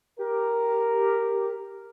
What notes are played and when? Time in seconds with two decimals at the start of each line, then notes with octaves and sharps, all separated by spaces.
0.19 G4 A#4